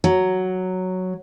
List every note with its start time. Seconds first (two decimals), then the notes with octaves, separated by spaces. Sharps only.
0.04 F#3